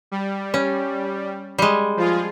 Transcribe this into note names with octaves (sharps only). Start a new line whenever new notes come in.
G3
C#4
G3 G#3
F3 F4 G#4